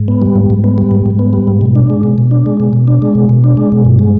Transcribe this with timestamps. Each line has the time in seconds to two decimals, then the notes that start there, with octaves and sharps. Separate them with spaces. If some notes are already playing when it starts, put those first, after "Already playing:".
Already playing: G#2
0.08 B3
0.22 G3
0.35 G#2
0.50 G#2
0.64 B3
0.78 G3
0.91 G#2
1.06 G#2
1.19 B3
1.33 G3
1.47 G#2
1.61 B2
1.75 D4
1.90 G#3
2.03 B2
2.18 B2
2.31 D4
2.46 G#3
2.60 B2
2.73 B2
2.88 D4
3.02 G#3
3.15 B2
3.29 B2
3.44 D4
3.57 G#3
3.72 B2
3.85 G2
3.99 G#3